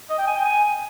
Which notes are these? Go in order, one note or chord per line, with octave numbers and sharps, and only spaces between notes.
D#5
G5
G#5
G5
G#5